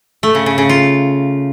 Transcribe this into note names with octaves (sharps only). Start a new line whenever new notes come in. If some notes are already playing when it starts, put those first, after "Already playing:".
A3
C#3
C#3
C#3
F4